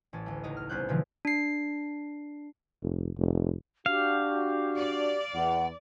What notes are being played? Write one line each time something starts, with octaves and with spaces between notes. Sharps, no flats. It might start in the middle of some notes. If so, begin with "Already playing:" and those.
A1 C#4 A5
D2 A3
C#2 D#4 D#5
F6
C2 B3 C#4 C5 F#6 G6
B2 D3 E3 F3 G#3
D4 C7
F1
F1
D4 F#4 G4 F5
D5
E2 F#5